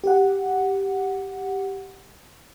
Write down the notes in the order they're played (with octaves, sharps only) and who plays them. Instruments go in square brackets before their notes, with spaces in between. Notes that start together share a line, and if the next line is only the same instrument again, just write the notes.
[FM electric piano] G4 F#5